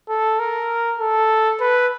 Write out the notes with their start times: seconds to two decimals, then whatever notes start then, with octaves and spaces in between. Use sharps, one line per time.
0.09 A4
0.39 A#4
1.00 A4
1.60 B4